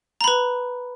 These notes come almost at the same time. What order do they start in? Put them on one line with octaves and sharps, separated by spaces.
A#5 B5 B4